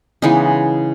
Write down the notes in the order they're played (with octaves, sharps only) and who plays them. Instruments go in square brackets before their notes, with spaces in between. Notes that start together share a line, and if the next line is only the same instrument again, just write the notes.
[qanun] C#3 E3 G#3 B3 D#4